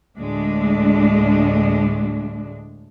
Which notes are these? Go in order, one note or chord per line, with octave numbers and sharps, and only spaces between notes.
D2 A2 G#3 D4